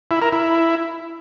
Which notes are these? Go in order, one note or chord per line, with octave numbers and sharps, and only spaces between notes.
E4
A#4
E4